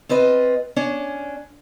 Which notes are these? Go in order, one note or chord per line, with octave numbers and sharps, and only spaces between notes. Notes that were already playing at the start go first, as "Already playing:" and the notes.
C4 F4 B4 D#5
C#4 D4 D5